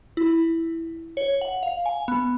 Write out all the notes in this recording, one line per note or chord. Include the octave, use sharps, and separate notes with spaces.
E4
C#5
F#5
F5
G#5
B3